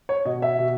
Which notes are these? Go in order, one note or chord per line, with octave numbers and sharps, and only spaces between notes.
C#5
B2 D#5
E5
B2